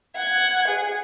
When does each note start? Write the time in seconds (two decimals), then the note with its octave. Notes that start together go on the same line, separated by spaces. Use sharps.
0.16 F#5 G#6
0.68 G#4